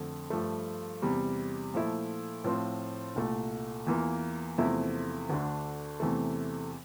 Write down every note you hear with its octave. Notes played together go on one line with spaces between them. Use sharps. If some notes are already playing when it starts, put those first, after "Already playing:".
Already playing: F2 D3 A3
G2 F3 A3
E2 C3 G3
A#2 F3 A3 E4
A2 F3 C4 F4
C2 A#2 A3
E2 E3 A#3 F4
E2 C3 F3 A3 E4
D2 D3 A3 D4
E2 C3 E3 A3